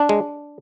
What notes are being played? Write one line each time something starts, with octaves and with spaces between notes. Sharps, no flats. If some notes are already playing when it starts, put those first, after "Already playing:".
Already playing: D4
G#3